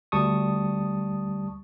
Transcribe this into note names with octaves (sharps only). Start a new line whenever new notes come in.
D2 G3 A5 C#6 D#6